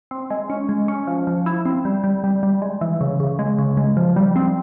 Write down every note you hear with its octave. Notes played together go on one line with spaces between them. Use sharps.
C4
G#3
C#4
G#3
C#4
F3
F3
E4
C4
G3
G3
G3
G3
G#3
E3
C#3
C#3
G#3
C#3
G#3
F3
G3
C4